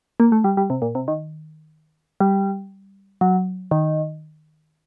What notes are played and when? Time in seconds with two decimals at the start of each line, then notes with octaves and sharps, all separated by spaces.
0.20 A#3
0.32 A3
0.44 G3
0.57 G3
0.70 C3
0.82 A#2
0.95 C3
1.08 D#3
2.20 G3
3.21 F#3
3.71 D#3